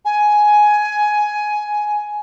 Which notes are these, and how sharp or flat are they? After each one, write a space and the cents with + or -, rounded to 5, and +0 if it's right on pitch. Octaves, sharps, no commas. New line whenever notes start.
G#5 +10